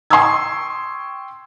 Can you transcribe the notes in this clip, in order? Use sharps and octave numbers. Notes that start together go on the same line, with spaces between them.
G5 C6 C#6 D#6 E6 G#6